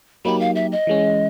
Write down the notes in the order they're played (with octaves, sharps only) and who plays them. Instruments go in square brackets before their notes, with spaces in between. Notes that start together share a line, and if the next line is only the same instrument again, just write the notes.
[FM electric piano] F#3 A#3 D#4 G4 [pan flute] B5
[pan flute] F5
E5
D#5
[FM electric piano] E3 G#3 C#4